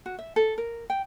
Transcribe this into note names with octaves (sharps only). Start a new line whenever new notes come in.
F#4
E5
A4
A#4
G5